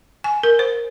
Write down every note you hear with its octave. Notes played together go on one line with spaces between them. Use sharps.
G#5
A#4
C5